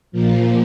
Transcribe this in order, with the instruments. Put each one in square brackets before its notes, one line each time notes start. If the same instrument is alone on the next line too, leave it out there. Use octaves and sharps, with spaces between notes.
[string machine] A#2 F3 A#3